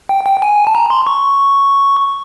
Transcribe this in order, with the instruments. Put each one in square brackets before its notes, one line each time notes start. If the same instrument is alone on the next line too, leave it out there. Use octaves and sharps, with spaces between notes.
[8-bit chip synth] G5
G5
G#5
A5
A#5
C6
C#6